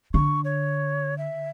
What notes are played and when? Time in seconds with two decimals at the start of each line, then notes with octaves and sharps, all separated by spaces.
0.14 D3 C#6
0.45 C#5
1.18 E5